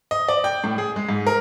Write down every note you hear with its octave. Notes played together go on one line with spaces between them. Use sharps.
D#5
D5
G5
A2
G#4
G#3
G#2
A#4